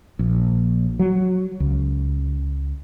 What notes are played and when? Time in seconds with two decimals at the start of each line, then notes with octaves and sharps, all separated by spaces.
0.19 A#1
0.99 F#3
1.60 C#2